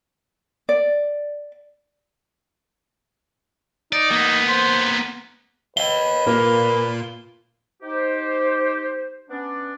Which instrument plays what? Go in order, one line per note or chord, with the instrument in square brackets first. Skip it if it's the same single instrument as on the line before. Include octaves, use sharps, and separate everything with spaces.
[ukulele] D5
[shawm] D#4 [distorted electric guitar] D5
[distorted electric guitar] A#3 B3
[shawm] C5
[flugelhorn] B4 [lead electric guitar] D#5 F5 [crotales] G7
[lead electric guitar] A#2 F4 [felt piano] A#3
[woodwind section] D#4 G4 [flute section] C5
[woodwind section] B3 C#4 D4